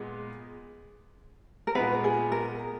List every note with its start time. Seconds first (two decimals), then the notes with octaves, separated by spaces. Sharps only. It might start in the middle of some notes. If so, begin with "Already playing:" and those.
Already playing: A#2 G#3 B3
1.67 A#4
1.75 A#2 G#3 B3 B4
2.04 G#4
2.32 A#4